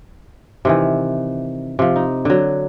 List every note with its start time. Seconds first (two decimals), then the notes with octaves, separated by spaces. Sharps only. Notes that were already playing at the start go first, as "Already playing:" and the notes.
0.65 C3 D#3 E3
1.79 C3 F3
1.96 D#4
2.25 D3 F#3